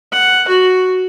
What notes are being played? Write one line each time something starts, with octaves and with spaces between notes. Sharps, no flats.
F#5
F#4